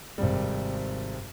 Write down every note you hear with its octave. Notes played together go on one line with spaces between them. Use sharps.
G#1 C3 G3